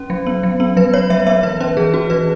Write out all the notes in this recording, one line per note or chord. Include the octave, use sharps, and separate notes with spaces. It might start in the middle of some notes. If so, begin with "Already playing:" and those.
Already playing: C#4
F#3
B3
F#3
B3
F#3 B4
B3 C#5
F#3 E5
B3 E5
E3 B4
C#4 B4
E3 G#4
C#4 F#4
E3 B4